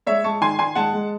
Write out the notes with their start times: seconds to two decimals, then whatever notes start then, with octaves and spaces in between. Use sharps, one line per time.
0.07 G#3 C#5 E5
0.24 G#3 A5 C#6
0.41 D#3 G#5 C6
0.59 D#3 G#5 C6
0.75 G#3 F#5 A5
0.93 G#3